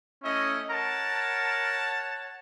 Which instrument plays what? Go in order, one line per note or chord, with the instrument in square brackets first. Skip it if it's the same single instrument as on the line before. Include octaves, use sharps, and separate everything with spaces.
[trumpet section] A3 E4 D#5 [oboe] C#4
[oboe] A#4 [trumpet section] C#5 F#5 A5